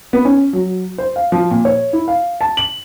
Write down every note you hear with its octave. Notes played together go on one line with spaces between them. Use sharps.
B3
C#4
F#3
C5
F5
F3
A#2
C#5
E4
F5
A5
F#7